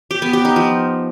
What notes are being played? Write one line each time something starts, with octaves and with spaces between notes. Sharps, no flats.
G4
B3
G4
D#4
F3